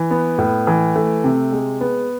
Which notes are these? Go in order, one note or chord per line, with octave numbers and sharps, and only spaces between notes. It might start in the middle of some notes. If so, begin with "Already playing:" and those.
Already playing: E3
B3
A2
E3
A3
C3
G#3
B3